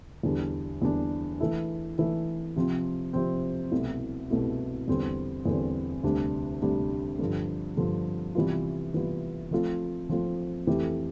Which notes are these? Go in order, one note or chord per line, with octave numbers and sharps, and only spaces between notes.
E2 D3 G3 D4
E2 D3 G3 D4
E3 A3 E4 A4
E3 A3 E4 A4
C3 F3 C4
C3 F3 C4
C2 B2 A3 E4
C2 B2 A3 E4
E2 D3 G3 C4
E2 D3 G3 C4
D2 C3 G3 D4
D2 C3 G3 D4
G2 D3 F3
G2 D3 F3
C3 E3 G3 B3 F4
C3 E3 G3 B3 F4
F3 A3 C4 F4
F3 A3 C4 F4
F2 E3 A3 E4 G4